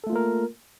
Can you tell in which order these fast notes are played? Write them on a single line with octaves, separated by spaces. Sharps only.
A4 A3 F4 A#3 A#4